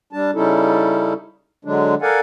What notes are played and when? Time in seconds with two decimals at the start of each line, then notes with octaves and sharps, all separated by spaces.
0.13 G3 D4 A5
0.35 C#3 G3 C#4 D#4 E4 A4
1.65 D3 F#3 G#3 D4
2.02 A4 A#4 D5 F5 F#5 G#5